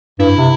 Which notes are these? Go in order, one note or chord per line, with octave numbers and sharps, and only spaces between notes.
G2 E4
C3